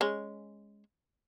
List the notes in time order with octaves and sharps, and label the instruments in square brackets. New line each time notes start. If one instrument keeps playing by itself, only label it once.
[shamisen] G#3 C#4